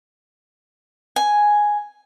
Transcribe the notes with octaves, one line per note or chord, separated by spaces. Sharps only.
G#5